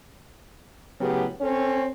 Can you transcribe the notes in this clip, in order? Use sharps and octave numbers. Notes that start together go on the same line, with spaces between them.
A2 C#3 F#3 B3 G4
C4 C#4 A4 C#5